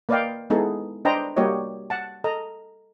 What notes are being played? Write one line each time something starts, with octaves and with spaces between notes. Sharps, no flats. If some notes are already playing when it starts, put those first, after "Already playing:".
A#3 B4 D5 D#5 F5 G5
G#3 B3 D#4 E4 G#4 A4
D4 B4 C5 D#5 G5 A#5
G3 A#3 F#4 G4 C#5 D#5
F#5 A5
A4 D#5 A#5